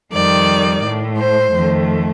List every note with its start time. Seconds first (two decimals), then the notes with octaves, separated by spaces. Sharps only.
0.12 F2 D#3 G3 D5
0.83 A2 A3
1.18 C5
1.53 F2 D#3 A3